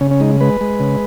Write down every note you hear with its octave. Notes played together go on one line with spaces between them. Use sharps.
C#3 C#4
C#4
G#3 D#4
G#3 B4
G#3
C#3